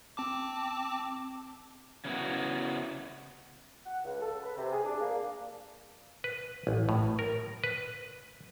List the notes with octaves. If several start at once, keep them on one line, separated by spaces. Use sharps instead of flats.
C4 A5 D6
C#3 B3 E4 F#4
F#5
C#2
A4
B4
C3
G#4
D4
A#3
B4
A1
A2
A#4
B4